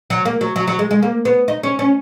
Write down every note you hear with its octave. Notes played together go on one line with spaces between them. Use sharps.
F#3
A#3
F#3
F#3
F#3
G#3
G#3
A#3
B3
D#4
C#4
C#4